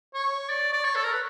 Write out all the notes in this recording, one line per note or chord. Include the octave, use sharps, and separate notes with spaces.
C#5
D5
D5
C#5
A4
A#4
B4